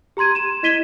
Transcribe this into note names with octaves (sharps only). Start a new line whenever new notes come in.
G4 A#5 C6 G#6 D#7
D#7 E7
E4 D#5 G#6 B6 D#7 G7